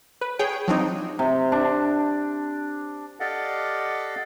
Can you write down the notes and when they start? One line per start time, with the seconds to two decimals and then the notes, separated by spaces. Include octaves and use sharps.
0.21 B4
0.39 G#4 C#5 G5
0.68 F3 F#3 C4 D4 D#4
1.19 C3
1.52 D4
3.20 G4 A4 D5 D#5 F5 F#5